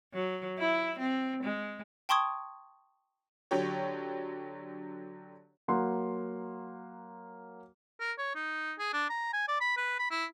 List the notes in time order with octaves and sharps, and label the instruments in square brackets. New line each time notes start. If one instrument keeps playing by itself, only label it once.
[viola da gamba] F#3
E4
C4
G#3
[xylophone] G5 A5 C6 C#6 D#6 G#6
[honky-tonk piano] D3 F#3 G4 C#5
[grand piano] F#3 A#3 F#5 C6
[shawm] A#4
C#5
D#4
G#4
D4
A#5
G#5
D5
B5
B4
B5
E4